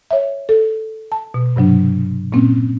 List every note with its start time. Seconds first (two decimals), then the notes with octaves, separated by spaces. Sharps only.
0.11 C#5 E5
0.49 A4
1.12 A5
1.34 B2
1.56 G2 C3 F#3 D4
2.32 A#2 A#3 C4 C#4